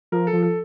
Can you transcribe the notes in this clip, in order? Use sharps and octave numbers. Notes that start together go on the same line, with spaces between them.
F3 A#4
A4
F3
A4